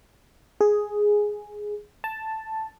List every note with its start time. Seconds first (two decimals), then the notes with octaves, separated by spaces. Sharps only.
0.61 G#4
2.04 A5